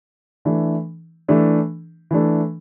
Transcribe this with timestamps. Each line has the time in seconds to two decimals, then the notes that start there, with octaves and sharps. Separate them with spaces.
0.45 E3 A3 D4
1.28 E3 A3 D4
2.11 E3 A3 D4